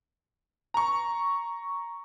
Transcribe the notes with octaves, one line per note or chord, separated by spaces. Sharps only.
A#5 C#6